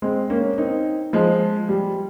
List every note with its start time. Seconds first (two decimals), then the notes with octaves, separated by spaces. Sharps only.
0.02 G#3 C4
0.30 A#3 C#4
0.58 C4 D#4
1.13 F3 G#3
1.69 G3